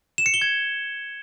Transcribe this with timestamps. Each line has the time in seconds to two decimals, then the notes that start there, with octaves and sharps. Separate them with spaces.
0.18 E7
0.26 C#7
0.34 G7
0.42 G#6